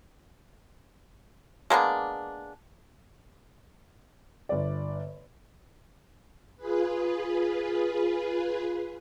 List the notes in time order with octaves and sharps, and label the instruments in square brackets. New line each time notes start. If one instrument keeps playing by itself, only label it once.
[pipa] G#3 A#3 B3 D4
[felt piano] G1 D5
[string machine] F4 G#4 B4